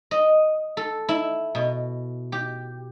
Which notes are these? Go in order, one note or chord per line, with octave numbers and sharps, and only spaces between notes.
D#5
A4
E4
B2
G4